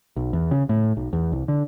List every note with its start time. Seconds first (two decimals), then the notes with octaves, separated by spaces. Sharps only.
0.16 B1
0.33 E2
0.51 C#3
0.69 A2
0.97 B1
1.13 E2
1.32 C2
1.48 D3